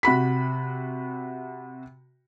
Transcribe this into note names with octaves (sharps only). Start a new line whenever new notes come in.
C3 F#4 B5 B6